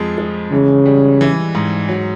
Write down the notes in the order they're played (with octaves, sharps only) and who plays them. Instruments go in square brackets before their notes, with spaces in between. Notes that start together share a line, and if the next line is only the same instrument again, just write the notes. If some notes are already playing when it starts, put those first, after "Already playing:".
Already playing: [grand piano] F2 F3 G#3
G#3
[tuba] C#3 [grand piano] E3
[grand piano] G3
E3
G#2
F#3